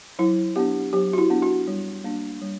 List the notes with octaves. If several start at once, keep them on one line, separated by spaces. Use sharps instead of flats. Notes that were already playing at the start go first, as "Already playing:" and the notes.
F#3 E4
B3 D4 G4
F#3 G4
F#4
E4
B3 D4
F#4
G3
A#3 D4
G3